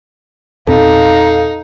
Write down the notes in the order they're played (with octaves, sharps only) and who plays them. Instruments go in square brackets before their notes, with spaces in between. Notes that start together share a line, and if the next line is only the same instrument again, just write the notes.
[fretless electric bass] E2 A#2 C4 [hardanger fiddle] D#4 [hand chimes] A4 [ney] F5